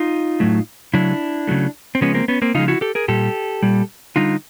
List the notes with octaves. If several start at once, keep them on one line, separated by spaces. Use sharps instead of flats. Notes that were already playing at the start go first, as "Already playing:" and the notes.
Already playing: D#4 F4
A2 F#3 A3
C#3 F#3 A3 D4 E4
C#3 F#3 A3
C4
C#3 F3 G#3 B3 C#4
A#3 C4
B3 C#4
A#3 C4
C#3 F3 G#3 D#4 F4
E4 F#4
G4 A4
G#4 A#4
A#2 G3 G4 A4
A#2 G3
D3 G3 D#4 F4